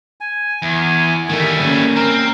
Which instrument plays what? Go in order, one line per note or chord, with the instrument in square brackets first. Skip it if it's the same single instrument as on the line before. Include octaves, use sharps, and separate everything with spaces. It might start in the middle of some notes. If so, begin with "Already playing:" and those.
[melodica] G#5
[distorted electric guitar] E2
[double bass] D#3 [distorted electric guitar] G3 A3
[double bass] A#3 C#4
[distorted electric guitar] C4 [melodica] A#4